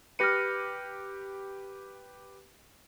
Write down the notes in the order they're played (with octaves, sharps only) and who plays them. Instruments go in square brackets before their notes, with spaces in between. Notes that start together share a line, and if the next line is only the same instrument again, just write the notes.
[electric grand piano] G4 B4 D#7 [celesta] F6 A#6 C#7